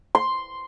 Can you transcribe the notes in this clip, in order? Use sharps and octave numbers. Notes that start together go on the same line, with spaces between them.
C6